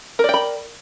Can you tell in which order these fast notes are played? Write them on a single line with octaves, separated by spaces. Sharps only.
A#4 D5 G5 B5